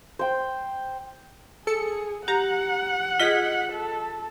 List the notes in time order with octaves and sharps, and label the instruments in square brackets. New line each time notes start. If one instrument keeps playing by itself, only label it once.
[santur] C5 G5
[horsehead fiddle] G#4 [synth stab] A4 C#7
[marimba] G4 [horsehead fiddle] F#5 [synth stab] A#5
[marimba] F4 G#4 [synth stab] D#5 B6
[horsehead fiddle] A4